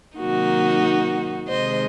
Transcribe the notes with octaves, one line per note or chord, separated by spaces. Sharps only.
C3 D#3 F#3 A#3 D#4 F#4
C3 D#3 G#3 C5 D#5